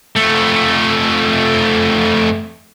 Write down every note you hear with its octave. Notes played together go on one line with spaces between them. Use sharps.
F2 A3